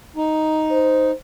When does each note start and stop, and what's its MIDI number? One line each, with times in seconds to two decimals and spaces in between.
0.16 1.11 63
0.72 1.13 72